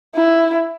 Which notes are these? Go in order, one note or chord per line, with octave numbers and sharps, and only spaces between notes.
E4